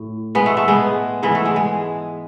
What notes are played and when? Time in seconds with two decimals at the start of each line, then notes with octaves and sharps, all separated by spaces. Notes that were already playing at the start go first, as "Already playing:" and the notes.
Already playing: A2
0.35 G#3 B3
0.46 A3
0.57 A3
0.68 G#3 B3
1.23 G#2 E3 G#3 B3
1.35 A3
1.45 G#3
1.56 G#3